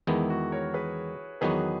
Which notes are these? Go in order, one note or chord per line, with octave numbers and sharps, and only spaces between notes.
E2 D#3 G#3 B3 E4
F#4
A#4 C#5
G#4 B4
E2 D#3 F#3 B3 F#4 G#4 B4